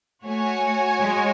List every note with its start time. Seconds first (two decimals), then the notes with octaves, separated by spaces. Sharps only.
0.25 A3 F#4 C#5 G#5
1.00 G#3